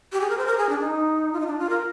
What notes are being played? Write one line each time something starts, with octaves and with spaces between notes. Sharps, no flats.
G4
G#4
A#4
C5
A#4
G#4
D4
D#4
F4
D#4
D4
F4
A#4